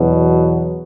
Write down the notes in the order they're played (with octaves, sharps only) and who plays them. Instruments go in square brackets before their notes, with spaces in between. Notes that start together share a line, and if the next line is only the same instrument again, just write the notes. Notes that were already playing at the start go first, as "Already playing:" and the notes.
Already playing: [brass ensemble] E2 B2 F#3